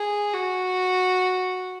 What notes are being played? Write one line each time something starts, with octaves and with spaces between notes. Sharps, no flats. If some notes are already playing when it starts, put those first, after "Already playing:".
Already playing: G#4
F#4